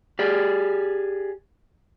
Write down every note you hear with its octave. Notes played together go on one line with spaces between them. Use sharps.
G4 G#4 D5